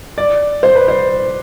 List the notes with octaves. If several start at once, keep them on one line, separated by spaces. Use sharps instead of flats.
D5
C5
B4
C5